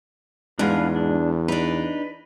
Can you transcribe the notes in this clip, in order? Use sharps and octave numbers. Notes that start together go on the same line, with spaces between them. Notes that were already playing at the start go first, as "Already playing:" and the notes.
E2 G#2 G#3 D4 B4 F5
D4
D4 D#4 B4